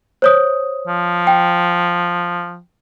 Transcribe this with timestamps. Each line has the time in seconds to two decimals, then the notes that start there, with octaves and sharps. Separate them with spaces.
0.22 C5 C#5 D#6
0.87 F3
1.27 G5